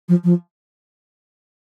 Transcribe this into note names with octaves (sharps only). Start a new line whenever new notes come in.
F3
F3